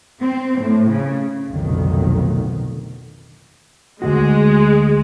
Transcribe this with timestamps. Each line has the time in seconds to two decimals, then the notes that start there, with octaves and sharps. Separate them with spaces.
0.20 C4
0.59 A2
0.90 C#3
1.49 F1 B1 F2 A2 D3 D#3
4.02 D2 G2 G#3 F#4